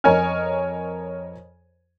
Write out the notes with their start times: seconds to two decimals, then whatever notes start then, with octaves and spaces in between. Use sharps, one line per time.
0.04 F2 A#4 C#5 D#5 G#5 F6